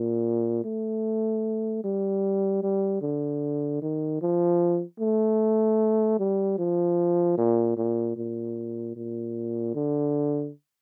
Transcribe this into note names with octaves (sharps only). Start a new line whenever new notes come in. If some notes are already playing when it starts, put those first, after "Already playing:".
Already playing: A#2
A3
G3
G3
D3
D#3
F3
A3
G3
F3
A#2
A#2
A#2
A#2
D3